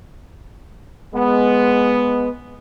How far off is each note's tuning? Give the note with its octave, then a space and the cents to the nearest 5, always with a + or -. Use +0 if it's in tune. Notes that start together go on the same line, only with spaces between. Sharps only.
G#3 +0 B3 +0